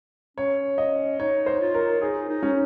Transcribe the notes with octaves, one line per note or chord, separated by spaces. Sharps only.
C#4 C#5
C#4 D#5
D#4 C#5
C5
F4
A#4
D#4 G#4
D#4
C#4